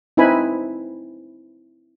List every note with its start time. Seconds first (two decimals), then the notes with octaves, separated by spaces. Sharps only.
0.17 C4 D#4 E4 B4 G#5 B5